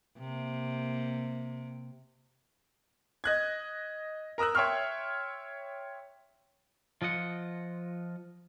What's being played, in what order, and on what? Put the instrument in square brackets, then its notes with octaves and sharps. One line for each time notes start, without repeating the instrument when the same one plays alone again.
[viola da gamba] C3 A#3
[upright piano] D#5 F#6 G#6
A#4 A#5 D#6 E6 F#6
C#5 E5 G5 C6 C#6 F6
[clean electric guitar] F3 F4 D#5 F#5